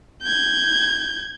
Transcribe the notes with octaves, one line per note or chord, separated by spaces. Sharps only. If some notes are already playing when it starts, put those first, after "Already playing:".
G6 G#6